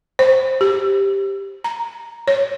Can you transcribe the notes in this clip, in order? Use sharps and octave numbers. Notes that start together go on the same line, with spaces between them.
C5
G4
A#5
C#5